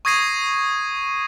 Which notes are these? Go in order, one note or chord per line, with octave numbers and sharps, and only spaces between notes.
C#6 D#6 G#6 A#6 C7 D#7